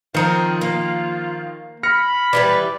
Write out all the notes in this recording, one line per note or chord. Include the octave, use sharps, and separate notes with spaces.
D#3 F3 C4 D#4 F4 A#4 C#7
A#3
B5 F6 A#6 C#7
E3 G3 B4 D5